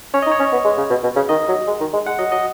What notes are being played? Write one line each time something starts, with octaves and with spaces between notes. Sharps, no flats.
C#4 C#5
D#5
D#4
C#5
C#4
B3
G#3
C#3
B2
B2
C#3
D#3 D#5
F#3
G#3
D#3
G#3
G#3 F#5
F#3 D#5
F#3 D#5